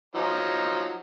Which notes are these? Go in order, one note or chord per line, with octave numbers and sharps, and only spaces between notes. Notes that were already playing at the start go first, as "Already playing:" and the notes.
F3 F#3 D#4